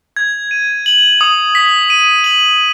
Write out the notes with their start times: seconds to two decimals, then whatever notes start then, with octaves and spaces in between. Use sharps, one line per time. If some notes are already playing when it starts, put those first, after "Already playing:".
0.16 G#6
0.51 D#7
0.86 F#7
1.21 D#6
1.55 B6
1.90 D#7
2.24 F#7